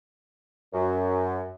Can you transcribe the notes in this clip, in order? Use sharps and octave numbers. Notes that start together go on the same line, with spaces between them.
F#2